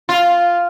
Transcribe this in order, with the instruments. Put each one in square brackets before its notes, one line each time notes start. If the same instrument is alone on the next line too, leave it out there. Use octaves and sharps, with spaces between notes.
[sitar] F4